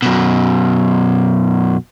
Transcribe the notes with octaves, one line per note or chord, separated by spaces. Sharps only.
F#2 B2